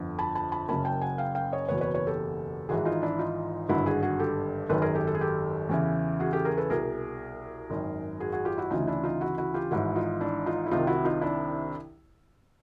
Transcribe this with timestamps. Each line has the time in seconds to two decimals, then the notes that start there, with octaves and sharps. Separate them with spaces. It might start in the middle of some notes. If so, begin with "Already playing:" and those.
Already playing: G1 F2 D3 F3
0.19 A5 B5
0.35 A5 B5
0.52 A5 B5
0.68 F#1 F#2 C#3 A5 B5
0.85 G5 A5
1.02 F#5 G#5
1.18 F5 G5
1.35 F5 G5
1.52 C#5 D#5
1.69 F#1 E2 B2 B4 C#5
1.81 B4 C#5
1.94 B4 C#5
2.07 G4 A4
2.69 G#1 G#2 E3 F#4 G#4
2.85 D#4 F4
3.02 D4 E4
3.19 D#4 F4
3.69 G#1 G2 D3 E4 F#4
3.86 F#4 G#4
4.03 F#4 G#4
4.20 G4 A4
4.69 G#1 F#2 D#3 A4 B4
4.82 G#4 A#4
4.95 G4 A4
5.07 A4
5.15 G#4
5.21 G4 A4
5.69 E2 C#3 E3
6.20 F#4 G#4
6.33 G4 A4
6.45 G#4 A#4
6.58 A4 B4
6.70 C2 B2 G#4 A#4
7.70 G#1 F#2 D#3
8.20 F#4 G#4
8.32 F#4 G#4
8.45 F4 G4
8.58 E4 F#4
8.70 D2 C#3 E3 D#4 F4
8.87 D4 E4
9.03 D#4 F4
9.21 E4 F#4
9.38 E4 F#4
9.54 F4 G4
9.71 G#1 G#2 E3 E4 F#4
9.96 D#4 F4
10.20 D4 E4
10.46 D#4 F4
10.66 E4
10.71 C2 C3 D#3 D#4 F4
10.87 E4 F#4
11.05 D#4 F4
11.21 D4 E4